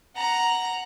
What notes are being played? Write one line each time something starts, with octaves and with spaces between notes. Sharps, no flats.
F#5 A#5